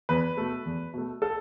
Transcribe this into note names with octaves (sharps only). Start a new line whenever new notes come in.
E2 B4
B2 A3
E2
B2 A3
A4